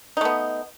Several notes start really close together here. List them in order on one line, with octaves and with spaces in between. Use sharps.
D#4 A3 B3